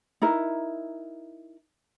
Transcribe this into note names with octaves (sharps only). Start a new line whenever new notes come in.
D#4 E4 A#4